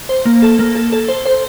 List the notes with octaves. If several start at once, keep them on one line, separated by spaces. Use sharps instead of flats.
C5
A#3
A4
A#3
A4
A4
C5
C5